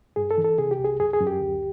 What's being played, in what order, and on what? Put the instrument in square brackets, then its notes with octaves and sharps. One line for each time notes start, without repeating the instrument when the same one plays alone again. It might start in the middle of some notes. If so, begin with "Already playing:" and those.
[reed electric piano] G2 G#4
A4
E3
A4
C3 G#4
G4
C2
G#4
F#2 G#4
G#4
F#2
G4
D2